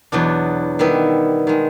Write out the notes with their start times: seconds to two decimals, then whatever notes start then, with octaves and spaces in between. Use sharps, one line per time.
0.12 E2 B2 F#3 B3 D4
0.79 D#3 G3 B3 E4
1.47 D#3 G#3